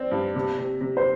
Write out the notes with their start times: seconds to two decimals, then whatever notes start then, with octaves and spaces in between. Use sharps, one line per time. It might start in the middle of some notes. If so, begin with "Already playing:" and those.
Already playing: C4 D5
0.11 G2
0.35 C3
0.58 C3
0.81 C3
0.97 C5